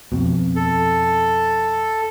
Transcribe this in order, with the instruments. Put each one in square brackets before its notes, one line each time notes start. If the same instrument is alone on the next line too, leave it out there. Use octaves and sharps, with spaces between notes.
[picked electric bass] F2 B2
[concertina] A4